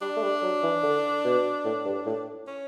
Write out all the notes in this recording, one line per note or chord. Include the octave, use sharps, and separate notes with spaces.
G3 D4
A3
G3
F#3
E3
D3
B2
A2
G2
A2
C#4